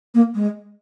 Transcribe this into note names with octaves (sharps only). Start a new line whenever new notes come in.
A#3
G#3